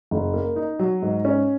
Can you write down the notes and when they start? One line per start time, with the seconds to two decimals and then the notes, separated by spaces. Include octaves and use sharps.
0.11 F#1
0.34 A#3
0.56 D#4
0.79 F#3
1.02 G#2
1.25 C#4